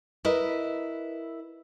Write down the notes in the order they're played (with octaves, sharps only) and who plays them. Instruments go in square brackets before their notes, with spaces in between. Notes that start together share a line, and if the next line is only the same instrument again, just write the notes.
[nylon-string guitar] E4 A#4 B4 D#5